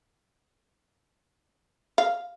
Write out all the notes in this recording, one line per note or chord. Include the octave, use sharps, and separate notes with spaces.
F5